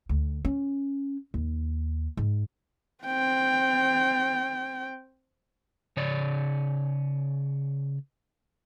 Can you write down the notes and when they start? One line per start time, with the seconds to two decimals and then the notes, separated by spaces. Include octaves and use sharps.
0.09 D2
0.45 C#4
1.34 D#2
2.17 G#2
3.04 C4 G5
5.97 C#3 C#5 D5